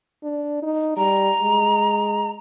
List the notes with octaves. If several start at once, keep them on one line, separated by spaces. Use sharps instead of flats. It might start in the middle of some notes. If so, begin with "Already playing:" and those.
D4
D#4
G3 A#5
G#3